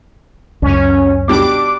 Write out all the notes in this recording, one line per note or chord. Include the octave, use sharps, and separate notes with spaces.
C#2 F#2 C#4
B2 G3 D4 D6